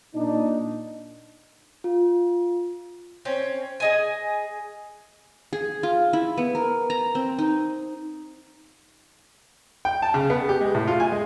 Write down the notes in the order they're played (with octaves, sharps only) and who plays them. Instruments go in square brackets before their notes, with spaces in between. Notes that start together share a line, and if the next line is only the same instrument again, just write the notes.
[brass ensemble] A#2 D4 D#4
[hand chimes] F4
[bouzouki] C4 C#4
G#4 D#5 G#5
[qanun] G#4
F4
E4
B3
A#4
A#5
C4
D#4
[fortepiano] G5
A5
C#3
B3
G4
G#3
A2
F4
G#5
G#3